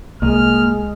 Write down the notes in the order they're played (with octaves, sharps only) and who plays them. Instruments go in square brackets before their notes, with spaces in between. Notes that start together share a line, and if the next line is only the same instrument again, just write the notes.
[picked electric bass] C2 [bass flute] G#3 [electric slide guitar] A#3 D#5 [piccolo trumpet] F6